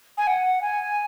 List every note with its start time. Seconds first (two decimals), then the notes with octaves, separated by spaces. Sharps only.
0.18 G#5
0.27 F#5
0.62 G#5